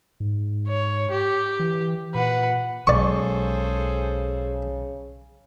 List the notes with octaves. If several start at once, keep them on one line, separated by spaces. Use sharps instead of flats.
G#2
C#5
G4
E3
A#2 B4 F#5
B1 C#3 G#3 G#4 A4 C5 D5 C#6